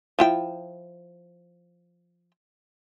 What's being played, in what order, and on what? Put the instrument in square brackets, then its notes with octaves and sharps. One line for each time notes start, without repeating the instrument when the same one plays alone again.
[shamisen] F3 E4 G5